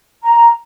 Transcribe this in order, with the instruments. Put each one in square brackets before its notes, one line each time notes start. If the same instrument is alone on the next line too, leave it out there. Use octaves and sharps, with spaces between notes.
[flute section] A#5